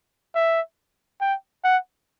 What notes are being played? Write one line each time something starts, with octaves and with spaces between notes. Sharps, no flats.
E5
G5
F#5